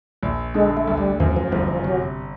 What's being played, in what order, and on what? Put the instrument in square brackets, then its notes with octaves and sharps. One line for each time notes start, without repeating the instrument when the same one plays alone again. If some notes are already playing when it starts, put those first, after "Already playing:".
[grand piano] A#1
[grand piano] D3 [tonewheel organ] G#3
[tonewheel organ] A3
[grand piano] D2
[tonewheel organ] G3
[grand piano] F#2 [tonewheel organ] F3
[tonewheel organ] F3
[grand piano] G1 [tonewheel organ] F3
[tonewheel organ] F3
[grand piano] C3 [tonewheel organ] F#3